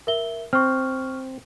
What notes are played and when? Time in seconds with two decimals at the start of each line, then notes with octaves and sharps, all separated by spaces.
0.07 A#4 E5 G7
0.53 C4 C#6 F6